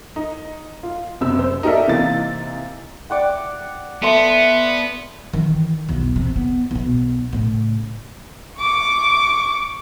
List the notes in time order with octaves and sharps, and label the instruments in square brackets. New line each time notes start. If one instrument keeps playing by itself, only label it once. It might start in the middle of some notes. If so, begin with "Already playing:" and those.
[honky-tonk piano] D#4
F4
F#1 C3 E6
C5
D#4 G4 A4 A#4 D5 E5
C3 E3 A#3 D#4 A6
[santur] D5 F#5 G5
[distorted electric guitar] B3 [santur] A4 E5 C6
[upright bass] D#3 E3
B1 E2
C3 E3
B3
B1 B2
A2 C#3
[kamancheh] C#6 D6